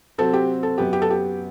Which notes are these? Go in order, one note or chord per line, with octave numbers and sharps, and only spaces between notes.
C3 F#3 C4 F#4 A4
G4
A4
F#2 F#3 B3 G4
G4
A4
G4